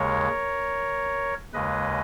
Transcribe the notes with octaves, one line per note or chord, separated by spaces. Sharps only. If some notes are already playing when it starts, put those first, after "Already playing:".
Already playing: D#2 C#3 G#3 A#4 C#5
D#2 C#3 G#3 B4 D#5